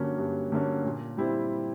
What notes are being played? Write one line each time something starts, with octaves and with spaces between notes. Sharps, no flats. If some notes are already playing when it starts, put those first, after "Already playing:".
Already playing: G2 D3 F#3 A#3 C#4
G2
D3 F#3 A#3 C#4
A#2
G3 C4 E4